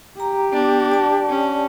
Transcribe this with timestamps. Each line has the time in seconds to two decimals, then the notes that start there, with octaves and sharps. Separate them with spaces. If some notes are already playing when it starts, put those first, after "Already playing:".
0.20 G4 A#5
0.53 B3 D4
0.92 D5 A5
1.29 C#4